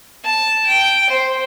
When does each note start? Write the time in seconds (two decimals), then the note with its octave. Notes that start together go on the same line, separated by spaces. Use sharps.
0.23 A5
0.66 G5
1.10 C5